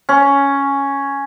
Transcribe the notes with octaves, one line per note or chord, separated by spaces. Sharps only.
C#4